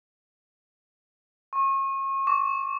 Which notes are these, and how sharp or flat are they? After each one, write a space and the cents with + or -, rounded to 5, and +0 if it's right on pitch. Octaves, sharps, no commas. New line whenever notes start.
C#6 -35
C#6 +45